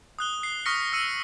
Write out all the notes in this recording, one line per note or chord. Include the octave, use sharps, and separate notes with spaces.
D#6 F#6 G7
C7
C#6 D#6 F6 A#6 B6 C#7
E6 C#7 D#7